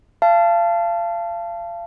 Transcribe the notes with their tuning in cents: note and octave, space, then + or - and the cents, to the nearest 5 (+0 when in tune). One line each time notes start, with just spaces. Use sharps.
F5 -30 A5 +0